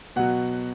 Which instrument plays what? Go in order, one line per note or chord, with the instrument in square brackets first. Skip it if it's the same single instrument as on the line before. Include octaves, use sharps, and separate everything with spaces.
[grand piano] B2 F#3 F#5